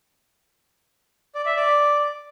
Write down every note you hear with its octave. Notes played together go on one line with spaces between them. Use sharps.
D5
E5
D5